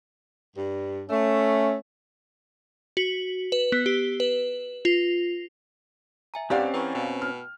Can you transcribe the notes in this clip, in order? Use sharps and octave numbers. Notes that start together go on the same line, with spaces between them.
G2
A3 C#4
F#4
B4
B3
G4
B4
F4
E5 G#5 A#5
G2 C4 C#4 G4 D5 F5 F#5 F#6
E3 B4 A#5 C#6
B2 G5
F6